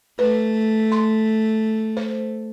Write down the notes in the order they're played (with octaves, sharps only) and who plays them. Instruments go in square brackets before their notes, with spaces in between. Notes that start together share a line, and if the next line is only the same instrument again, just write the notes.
[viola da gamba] A3 [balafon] B4
[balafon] C6
C5